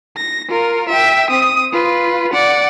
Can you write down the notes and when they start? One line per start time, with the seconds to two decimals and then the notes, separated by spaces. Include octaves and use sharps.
0.17 A#6
0.49 F4 A#4
0.89 E5 G5
1.30 C4 D#6
1.73 F4 B4
2.34 D5 F#5